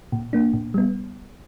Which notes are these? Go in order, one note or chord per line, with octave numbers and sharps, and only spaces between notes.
A#2
A#3 D4
A#2
G3 B3